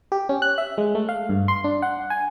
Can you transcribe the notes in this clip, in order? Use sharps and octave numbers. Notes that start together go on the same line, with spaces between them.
G4
C#4
F#6
E5
G#3
A3
F5
G2
C6
D4
F#5
G#5